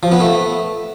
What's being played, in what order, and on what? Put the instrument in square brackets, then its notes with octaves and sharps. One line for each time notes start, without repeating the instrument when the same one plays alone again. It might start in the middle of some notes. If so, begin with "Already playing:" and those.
[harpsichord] F3
B3
A3